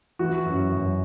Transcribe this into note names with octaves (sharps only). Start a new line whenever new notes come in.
E3 F#4
F#2
F#2